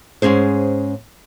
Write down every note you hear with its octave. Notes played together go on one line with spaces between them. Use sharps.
G#2 C#3 C#4 G#4 C5